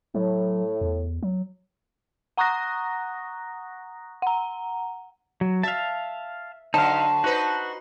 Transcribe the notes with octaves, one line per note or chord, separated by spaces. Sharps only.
A2 F#3
E2
F#3
F#5 A#5 C#6 D#6 F#6 A#6
F#5 A#5
F#3
E5 F5 A5
D3 F#3 D#4 C5 F5 A5
D#4 F#4 B4 C5